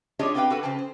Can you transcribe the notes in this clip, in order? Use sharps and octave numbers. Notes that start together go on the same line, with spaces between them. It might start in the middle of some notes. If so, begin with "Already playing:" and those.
D4 F4 G4 G#4 C#5 D#5
B3 C4 G4 B4 F5 G5
F#4 A4 B4 F#5
C#3 C#4 C5 G5 A5
C5